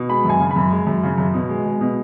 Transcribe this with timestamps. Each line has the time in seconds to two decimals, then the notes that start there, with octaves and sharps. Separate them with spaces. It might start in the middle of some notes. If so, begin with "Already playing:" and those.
Already playing: B2
0.09 G#3 B5
0.25 F#2 G#5
0.40 C#3
0.51 B5
0.56 F#2
0.72 G#3
0.87 F#2
1.03 C#3
1.18 F#2
1.34 B2
1.49 G#3
1.65 G#3
1.81 B2